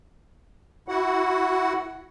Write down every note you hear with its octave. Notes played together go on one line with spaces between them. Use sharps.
E4 F#4 F#5